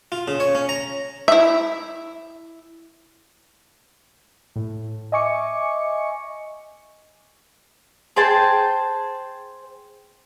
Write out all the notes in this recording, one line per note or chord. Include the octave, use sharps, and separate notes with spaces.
F4
C#3
C#5
C#4
A#5
E4 E5
A2
D#5 E5 G#5 C#6 D6 C#7
G#4 C5 G5 A5